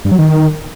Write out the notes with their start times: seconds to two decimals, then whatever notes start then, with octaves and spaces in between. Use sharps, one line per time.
0.05 G2
0.12 F#3
0.19 D#3